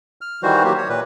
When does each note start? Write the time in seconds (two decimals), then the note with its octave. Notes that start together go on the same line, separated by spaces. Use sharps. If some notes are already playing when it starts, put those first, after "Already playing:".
0.21 F6
0.43 D#3 E3 G3 F#4 C5
0.64 F#3 A#3 G4
0.77 C#5
0.89 A#2 B4